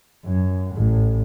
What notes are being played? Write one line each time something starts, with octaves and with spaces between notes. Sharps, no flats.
F#2
A1 A2